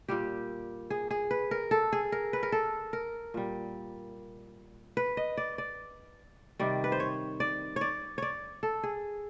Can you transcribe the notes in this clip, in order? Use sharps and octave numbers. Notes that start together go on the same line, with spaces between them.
A#2 G3 G4
G#4
G#4
B4
A#4
A4
G#4
A#4
B4
A#4
A4
A#4
A#2 G3
B4
D#5
D5
D5
C3 D#3 G3 D5
B4
C5
C#5
D5
C#5 D5
C#5 D5
A4
G#4